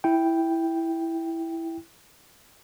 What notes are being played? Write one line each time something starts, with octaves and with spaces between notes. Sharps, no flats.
E4 G5